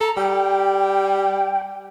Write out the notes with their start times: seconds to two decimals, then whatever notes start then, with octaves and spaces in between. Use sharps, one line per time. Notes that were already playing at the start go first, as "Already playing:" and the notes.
0.01 A4 A#5
0.17 G3 G5